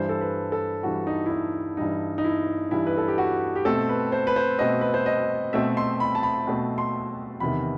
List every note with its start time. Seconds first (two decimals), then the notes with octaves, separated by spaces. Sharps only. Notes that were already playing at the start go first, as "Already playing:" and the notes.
Already playing: G2 E3 G3 C5
0.09 A4
0.21 B4
0.52 A4
0.83 G2 E3 G3 F#4
1.07 D#4
1.26 E4
1.31 D#4
1.77 G2 E3 G3 D#4
2.18 D#4
2.24 E4
2.71 G2 E3 G3 E4
2.87 B4
2.97 A4
3.08 G4
3.18 F#4
3.56 G4
3.65 B2 A3 C4 A4
3.89 B4
4.12 C5
4.27 B4
4.36 C5
4.59 B2 A3 C4 D#5
4.81 B4
4.94 C5
5.06 D#5
5.53 B2 A3 C4 E5
5.77 C6
6.00 B5
6.15 A5
6.23 B5
6.47 B2 A3 C4
6.78 C6
7.40 E2 C3 D#3 B5